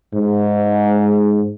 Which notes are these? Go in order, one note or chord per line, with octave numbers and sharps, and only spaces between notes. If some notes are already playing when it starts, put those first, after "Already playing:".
G#2